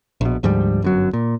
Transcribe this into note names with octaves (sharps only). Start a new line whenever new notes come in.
A#1 B2
D2 G#2 F3 G3
G1 F#2 F#3
A#2